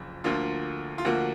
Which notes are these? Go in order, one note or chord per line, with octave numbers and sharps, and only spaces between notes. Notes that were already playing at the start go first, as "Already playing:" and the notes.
Already playing: F#1 F2
D2 D3 F3 A#3 F4
F4
D2 D3 F3 A#3 F#4